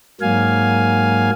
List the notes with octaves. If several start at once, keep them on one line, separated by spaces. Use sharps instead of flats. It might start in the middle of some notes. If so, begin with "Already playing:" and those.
G#2 F#3 A#3 F5 G#5